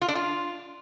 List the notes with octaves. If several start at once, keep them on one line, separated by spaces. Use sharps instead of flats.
F4
D4
F4